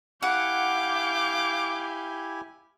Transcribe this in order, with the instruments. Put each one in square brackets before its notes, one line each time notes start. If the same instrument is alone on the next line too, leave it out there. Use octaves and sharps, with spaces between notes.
[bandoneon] E4 G4 G#5 [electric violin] F5 G6 [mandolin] F#5 [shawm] D6